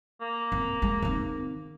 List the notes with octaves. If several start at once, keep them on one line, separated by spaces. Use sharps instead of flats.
A#3
C4
G#3
D#3 C4